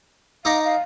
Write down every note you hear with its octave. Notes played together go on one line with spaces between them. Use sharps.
D#4 D#5 F5 D6
F5